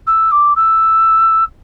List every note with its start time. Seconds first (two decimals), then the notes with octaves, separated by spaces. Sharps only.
0.07 E6
0.32 D6
0.56 E6